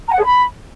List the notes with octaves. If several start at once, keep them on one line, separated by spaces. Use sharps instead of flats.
A#5
F#5
G#4
B5